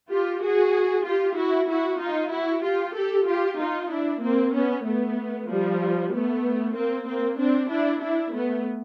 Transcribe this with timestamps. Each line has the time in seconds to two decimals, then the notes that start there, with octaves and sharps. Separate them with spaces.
0.10 F4 G4
0.42 F#4 G#4
1.05 F4 G4
1.37 E4 F#4
1.69 E4 F#4
2.00 D#4 F4
2.32 E4 F#4
2.64 F4 G4
2.95 G4 A4
3.27 F4 G4
3.59 D#4 F4
3.90 D4 E4
4.22 A#3 C4
4.54 B3 C#4
4.85 A3 B3
5.49 F3 G3
6.13 A3 B3
6.75 A#3 C4
7.07 A#3 C4
7.39 C4 D4
7.70 D4 E4
8.02 D4 E4
8.34 A3 B3